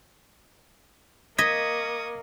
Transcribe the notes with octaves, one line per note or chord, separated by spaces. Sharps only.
A#3 D#5 C#6 D#6 G#6 A#6 B6